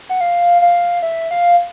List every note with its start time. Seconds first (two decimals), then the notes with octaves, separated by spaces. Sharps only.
0.09 F#5
0.21 F5
0.62 F5
1.03 E5
1.31 F5